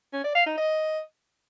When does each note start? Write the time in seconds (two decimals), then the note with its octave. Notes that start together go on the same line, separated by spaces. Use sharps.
0.13 C#4
0.24 D5
0.35 F5
0.46 D#4
0.57 D#5